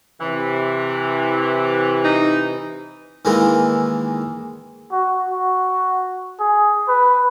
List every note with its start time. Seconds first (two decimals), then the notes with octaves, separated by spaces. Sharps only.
0.21 C3 E3
2.04 D#4
3.25 D#3 E3 G#3 A#3
4.92 F#4
5.28 F#4
6.40 G#4
6.88 B4